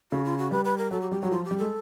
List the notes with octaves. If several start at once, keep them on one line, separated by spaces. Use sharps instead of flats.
C#3 F#4
F4
F#4
G3 B4
B4
A#4
F#3 A4
G4
G3 G4
F#3 F#4
F3 F4
G4
G3
G#3 A4